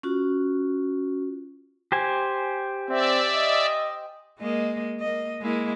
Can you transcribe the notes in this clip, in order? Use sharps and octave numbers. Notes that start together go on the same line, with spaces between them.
C#4 F4 F#4
G4 C5 G#5
C4 D5 E5
D#5
G#3 A#3 D#5
A#3 D#5
G#3 A#3 E4